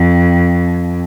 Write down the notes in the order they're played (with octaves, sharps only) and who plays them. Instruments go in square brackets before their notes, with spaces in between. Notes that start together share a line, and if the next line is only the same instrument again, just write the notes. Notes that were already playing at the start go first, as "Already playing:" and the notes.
Already playing: [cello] F2